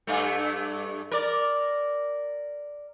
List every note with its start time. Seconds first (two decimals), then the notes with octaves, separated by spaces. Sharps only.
0.07 G2 A3
1.12 A#4 D5